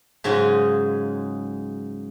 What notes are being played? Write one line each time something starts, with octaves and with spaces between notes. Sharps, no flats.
G#2 C#3 F#3 C#4 D#4 F4